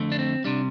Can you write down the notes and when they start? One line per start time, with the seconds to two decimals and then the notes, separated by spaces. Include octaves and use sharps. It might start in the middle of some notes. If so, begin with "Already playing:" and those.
Already playing: F2 D3 A3
0.12 D4
0.19 C4
0.44 C3 G3 D4